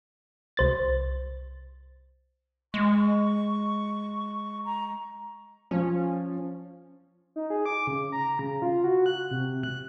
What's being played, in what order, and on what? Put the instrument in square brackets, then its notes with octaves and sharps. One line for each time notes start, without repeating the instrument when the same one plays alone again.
[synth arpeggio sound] C2 C5 A6
[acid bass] G#3 [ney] C#6
[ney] A#5
[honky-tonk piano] F3 [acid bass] C#4
[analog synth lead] D#4
G#4
D6
C#3
A#5
C#3
F4
F#4
F#6
C3
F#6